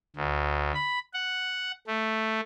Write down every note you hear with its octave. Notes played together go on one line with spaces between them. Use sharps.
D2
B5
F#5
A3